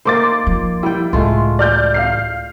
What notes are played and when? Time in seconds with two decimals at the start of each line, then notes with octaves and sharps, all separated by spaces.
0.05 A#3 D#4 C5 C6 D6 A6
0.47 F3
0.83 G3 E4 G5
1.13 C#2 A2 G#3 A3 F4
1.59 D5 F6 G6
1.94 F5 F6 C7